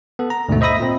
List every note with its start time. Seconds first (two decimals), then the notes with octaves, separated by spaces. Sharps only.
0.19 B3 A4
0.30 A#5
0.49 D2 G#2 B2 A3
0.61 C5 D#5 E5 B5 D#6 A#6
0.80 A#2 C4